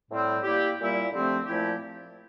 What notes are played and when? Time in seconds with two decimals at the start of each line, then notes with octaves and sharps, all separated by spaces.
0.10 A2 G3 C4
0.44 G3 A#3 E4 G4
0.78 A#2 G3 A#3 E4
1.11 D3 F3 A3 C4 G4
1.46 A#2 F3 A3 E4 G4